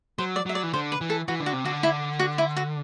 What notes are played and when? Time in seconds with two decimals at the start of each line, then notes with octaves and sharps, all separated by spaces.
0.18 F#3 C5
0.36 D5
0.46 F#3 E5
0.55 D5
0.63 E3
0.73 D3 C5
0.92 B4
1.01 E3
1.10 A4
1.28 E3 F#4
1.40 D3
1.46 F#4
1.53 C3
1.64 D3 F#4
1.83 E4
2.19 F#4
2.38 E4
2.57 F#4